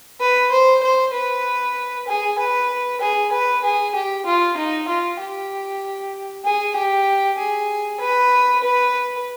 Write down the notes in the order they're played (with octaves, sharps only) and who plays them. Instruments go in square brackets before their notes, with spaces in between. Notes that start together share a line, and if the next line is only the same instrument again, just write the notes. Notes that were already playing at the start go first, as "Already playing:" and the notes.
[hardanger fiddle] B4
C5
C5
B4
G#4
B4
G#4
B4
G#4
G4
F4
D#4
F4
G4
G#4
G4
G#4
B4
B4